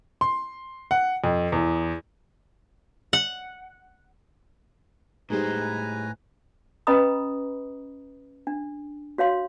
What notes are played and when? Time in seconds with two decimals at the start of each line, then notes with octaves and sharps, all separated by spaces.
0.21 C6
0.91 F#5
1.24 F2
1.52 E2
3.13 F#5
5.30 A2 G3 G#3 D#4 B4 C5 G#5 A#5
6.87 C#4 B4 D#5 A#5 B5 D#6
8.47 D4
9.18 F#4 C#5 F5 C6